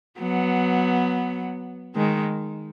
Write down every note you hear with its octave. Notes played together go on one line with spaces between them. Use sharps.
F#3 B3
D#3 G#3